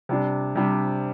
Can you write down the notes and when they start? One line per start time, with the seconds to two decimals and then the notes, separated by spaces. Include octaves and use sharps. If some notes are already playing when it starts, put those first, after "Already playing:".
0.09 C3 G3 D4
0.55 C3 G3 D4